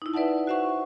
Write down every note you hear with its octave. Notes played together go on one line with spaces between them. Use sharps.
D#4 E4
B4 D5 E5 F#5 A5
F#4 C5 E5 F#5 C#6